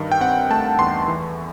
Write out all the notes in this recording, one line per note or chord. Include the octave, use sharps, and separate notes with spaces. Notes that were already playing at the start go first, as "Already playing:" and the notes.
Already playing: G2 D#3
G5
C4 F#5
A3 A5
E2 C6
E3